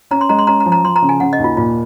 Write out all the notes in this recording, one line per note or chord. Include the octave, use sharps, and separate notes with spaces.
C#4 A#5
C6
G#3 A#5
C6
C#4 A#5
A#5
F3
A#5
F3 C6
A#5
C#3
G#5
C#3 F#5
D#5
D#2
F4
A#2 F4